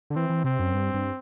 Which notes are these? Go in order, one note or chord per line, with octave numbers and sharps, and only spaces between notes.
D3
E3 C4
E3
C3 C4
F#2
G2
G2